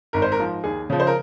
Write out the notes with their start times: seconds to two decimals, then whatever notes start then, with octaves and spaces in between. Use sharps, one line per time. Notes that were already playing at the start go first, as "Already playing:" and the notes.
0.13 G#1 A#4
0.22 C5
0.32 A#4
0.39 G#2 F3
0.64 D#2 G#4
0.90 C#3 F3
1.00 C5
1.07 A#4